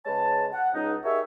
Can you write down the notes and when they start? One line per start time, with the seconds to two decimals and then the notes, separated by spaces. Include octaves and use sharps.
0.06 C#3 G#3 B4 C#5 A5
0.53 F#5
0.74 C#2 D#4
1.04 D#4 G4 G#4 A#4 C#5 E5